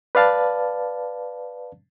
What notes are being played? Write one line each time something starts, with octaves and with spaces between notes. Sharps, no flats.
B4 D5 F5 A5